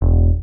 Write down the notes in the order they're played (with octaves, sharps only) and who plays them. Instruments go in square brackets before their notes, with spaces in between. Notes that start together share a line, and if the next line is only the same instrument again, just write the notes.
[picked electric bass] E1